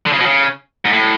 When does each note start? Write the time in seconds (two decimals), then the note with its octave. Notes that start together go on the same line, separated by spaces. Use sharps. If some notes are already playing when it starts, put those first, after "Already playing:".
0.06 D3
0.13 C#3
0.20 B2
0.26 C#3
0.85 G#2
0.93 A2